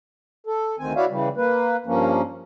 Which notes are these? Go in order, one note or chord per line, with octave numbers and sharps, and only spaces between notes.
A4
D2 D#3 C4 G#5
E4 F#4 C#5 D5 E5 F5
C#3 E3 G3
A#3 B4
G2 F3 A#3 C#4